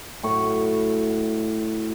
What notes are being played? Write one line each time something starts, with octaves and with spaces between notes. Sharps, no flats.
A2 F#3 C#6